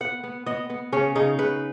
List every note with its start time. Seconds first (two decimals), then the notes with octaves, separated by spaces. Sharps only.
0.01 B3 F#5
0.24 B3
0.46 B3 D#5
0.70 B3
0.92 C#3 C#4
1.15 C#3 D#4
1.38 C#3 B4